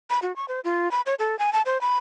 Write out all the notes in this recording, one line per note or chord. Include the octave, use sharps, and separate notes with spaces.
B5
F#4
C#6
C5
F4
B5
C#5
A4
G#5
A5
C5
B5